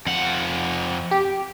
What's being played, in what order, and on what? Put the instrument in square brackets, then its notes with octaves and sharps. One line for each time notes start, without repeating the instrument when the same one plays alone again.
[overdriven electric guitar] F2 F#5
[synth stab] G4